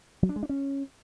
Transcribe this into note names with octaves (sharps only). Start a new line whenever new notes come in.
F#3
D4
G#3
D4
C#4